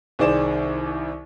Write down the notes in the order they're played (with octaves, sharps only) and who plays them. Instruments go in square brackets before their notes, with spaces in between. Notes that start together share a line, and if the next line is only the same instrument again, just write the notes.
[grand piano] C2 D#3 G#4 C5 D5 E7